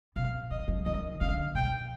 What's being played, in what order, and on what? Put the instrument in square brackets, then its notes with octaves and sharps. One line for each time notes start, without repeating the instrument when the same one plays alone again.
[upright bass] B2 [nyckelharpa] F5
[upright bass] D#3 [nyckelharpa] D#5
[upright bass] F3
[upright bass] D#3 [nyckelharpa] D#5
[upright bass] D3 [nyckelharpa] F5
[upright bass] B2 [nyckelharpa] G5